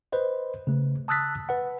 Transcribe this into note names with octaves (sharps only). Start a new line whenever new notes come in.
B4 C5 D#5
C#3 A3
A5 D#6 E6 F#6 A6 B6
B4 F#5